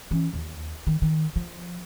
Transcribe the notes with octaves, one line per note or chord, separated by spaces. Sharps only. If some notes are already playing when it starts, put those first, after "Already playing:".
E3 C#4
D#2
D#3
D#3
F3